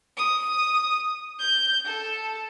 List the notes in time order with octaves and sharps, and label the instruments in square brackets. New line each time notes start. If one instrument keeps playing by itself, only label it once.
[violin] D#6
G6
A4